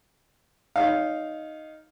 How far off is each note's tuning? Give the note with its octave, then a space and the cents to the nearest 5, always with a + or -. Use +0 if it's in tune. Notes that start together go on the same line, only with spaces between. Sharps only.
D#4 +0 C#5 +35 F5 +0